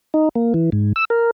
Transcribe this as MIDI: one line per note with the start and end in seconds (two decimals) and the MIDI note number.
0.14 0.29 63
0.35 0.53 58
0.54 0.70 52
0.72 0.93 44
0.96 1.05 88
1.10 1.31 70